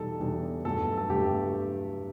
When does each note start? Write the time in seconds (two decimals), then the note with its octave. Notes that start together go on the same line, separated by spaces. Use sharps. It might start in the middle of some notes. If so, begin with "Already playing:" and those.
Already playing: E2 B2 G3 D#4 A4
0.20 E2 B2 G3 D#4
0.65 G2 F#3 A3 A4
0.98 A4
1.09 G2 F#3 A3 G4